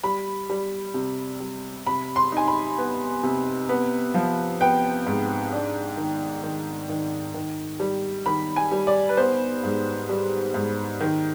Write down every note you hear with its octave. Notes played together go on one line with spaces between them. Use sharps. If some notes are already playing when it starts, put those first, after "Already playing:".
G3 B5
G3
C3
G3
C3 B5
C6
D#4 G#5
B5
B3
C3
B3
F3
B3 G5
G#2
D4
D#3
D#3
D#3
D#3
G3
D#3 B5
G#5
G3
D5
B4
B3 C5
G#2
G3
G#2
D#3